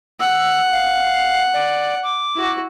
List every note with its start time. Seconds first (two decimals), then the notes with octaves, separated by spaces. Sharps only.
0.20 F#5 E6
0.72 F5
1.54 D5
2.03 D6
2.35 E4 F#4